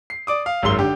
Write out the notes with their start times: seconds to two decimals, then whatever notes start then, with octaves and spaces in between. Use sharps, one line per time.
0.10 C7
0.27 D5 D6 D#6
0.46 F5
0.62 G#1 F#2 G#3 C6 G7
0.79 D3 G4